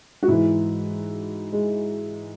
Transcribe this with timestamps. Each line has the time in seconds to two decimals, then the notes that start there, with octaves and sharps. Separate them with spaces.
0.23 F#4
0.28 G#2 E3 E4
1.53 G#3